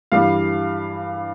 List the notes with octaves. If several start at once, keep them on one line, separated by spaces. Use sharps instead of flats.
G2 E3 G3 F5